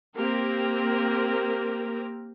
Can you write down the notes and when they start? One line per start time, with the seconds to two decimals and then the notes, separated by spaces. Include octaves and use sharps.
0.16 A#3 C4 G4 A#4